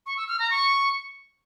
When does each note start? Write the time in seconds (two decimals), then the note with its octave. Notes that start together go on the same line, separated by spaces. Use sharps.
0.06 C#6
0.17 E6
0.28 F6
0.39 A#5
0.50 C#6